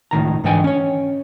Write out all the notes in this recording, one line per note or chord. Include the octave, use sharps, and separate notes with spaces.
C#2 A2 D#3 A#5
G#2 D3 E3 D#5 G5 G#5
C#4 C#5